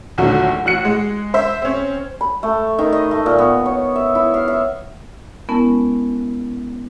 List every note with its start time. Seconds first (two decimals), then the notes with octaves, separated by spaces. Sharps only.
0.18 D#2 A#2 D3 F#3 A3
0.65 A1 F#4 F#6 C#7
0.85 G#3
1.34 C5 E5
1.62 C4 C#4
2.21 B5
2.43 A3
2.79 D#3
2.92 D#5
3.11 A3
3.26 A#2
3.38 B3
3.66 C#5
3.95 E5
4.15 E4
4.34 F5
4.48 E5
5.49 G#3 B3 C#4 E4 A#4 A5